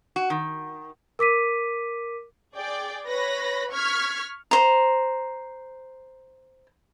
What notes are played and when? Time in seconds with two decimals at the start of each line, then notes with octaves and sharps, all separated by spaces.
0.16 F#4
0.30 D#3
1.19 A#4 D6 B6 D#7
2.56 G#4 D5 G5
3.06 B4 C#5 B5 A#6
3.71 C#6 F6 G#6 B6
4.51 C5 A#5